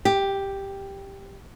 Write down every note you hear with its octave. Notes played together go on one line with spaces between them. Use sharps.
G4